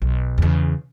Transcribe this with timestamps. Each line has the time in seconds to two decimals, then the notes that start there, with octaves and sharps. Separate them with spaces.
0.02 B1
0.38 E2 C#3